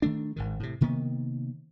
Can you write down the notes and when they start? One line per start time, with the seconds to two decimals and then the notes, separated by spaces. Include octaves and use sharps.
0.02 D#3 A3 D4
0.36 G#1 G#2 D#3
0.60 A2 C3
0.81 C3 D#3 A#3 B3